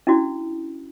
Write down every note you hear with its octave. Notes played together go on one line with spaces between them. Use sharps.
C#4 D4 E4 F#4